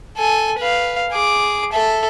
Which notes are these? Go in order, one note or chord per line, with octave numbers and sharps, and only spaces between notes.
A4 G#5
B4 F5
G#4 D6
A4 E5